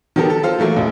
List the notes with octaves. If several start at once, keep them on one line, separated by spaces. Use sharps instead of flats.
D#3 F#3 B3 G4 A4 A#4
A4
F4 A4 C5 F5
E3 F#3 A3 A#3
E1 A1